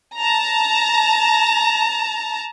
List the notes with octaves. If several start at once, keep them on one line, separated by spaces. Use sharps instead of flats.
A5 A#5